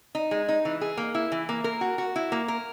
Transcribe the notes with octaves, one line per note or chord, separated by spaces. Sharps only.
D#4
G#3
D#4
E3
G#4
A#3
E4
E3
A#3
A#4
F#4
F#4
E4
A#3
A#4